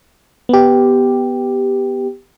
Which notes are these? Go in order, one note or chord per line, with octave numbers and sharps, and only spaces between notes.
B3 G4